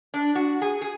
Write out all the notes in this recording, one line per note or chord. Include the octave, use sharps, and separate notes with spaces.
D4
F#4
G#4
G#4